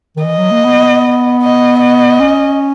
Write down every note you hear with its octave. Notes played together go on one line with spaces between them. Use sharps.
D#3
E3 D#5
F#3
A#3
B3
D#5
D#5
C#4